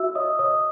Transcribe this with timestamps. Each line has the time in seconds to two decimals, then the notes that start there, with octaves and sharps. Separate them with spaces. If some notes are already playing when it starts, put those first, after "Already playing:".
Already playing: F#4 E5 E6
0.15 C#5 D#5 D#6
0.39 C#5 D#5 D#6